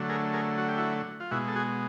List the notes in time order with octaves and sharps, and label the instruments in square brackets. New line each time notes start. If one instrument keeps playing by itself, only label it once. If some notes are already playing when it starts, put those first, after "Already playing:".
Already playing: [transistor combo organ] D3 F#3 A3
G#4 A#4
G#4 A#4
F#4
G4
E4 F#4
F4
B2 G#3 E4 F#4
A4
F#4 G#4